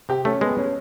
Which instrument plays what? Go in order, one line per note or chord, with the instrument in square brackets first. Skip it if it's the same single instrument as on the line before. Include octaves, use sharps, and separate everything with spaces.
[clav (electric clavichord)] C3 [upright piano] G4
[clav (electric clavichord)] A3 [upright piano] C#4
[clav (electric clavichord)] G#3 [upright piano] B3
[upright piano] C#4